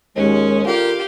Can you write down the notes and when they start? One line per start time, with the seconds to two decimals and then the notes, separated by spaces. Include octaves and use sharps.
0.16 D#2 G#3 C#4
0.66 D3 G3 F4 G4 A#4 F5